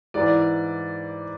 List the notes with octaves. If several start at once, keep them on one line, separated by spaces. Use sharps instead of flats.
G#2 E3 D5